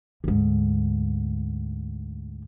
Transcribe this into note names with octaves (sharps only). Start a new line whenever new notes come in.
D2 G#2